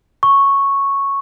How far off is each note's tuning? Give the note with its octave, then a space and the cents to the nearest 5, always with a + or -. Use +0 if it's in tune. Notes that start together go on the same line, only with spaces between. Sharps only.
C#6 -5